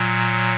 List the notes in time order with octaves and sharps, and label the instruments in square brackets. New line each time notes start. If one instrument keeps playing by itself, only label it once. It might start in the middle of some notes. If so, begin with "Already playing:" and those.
Already playing: [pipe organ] A#2 F#3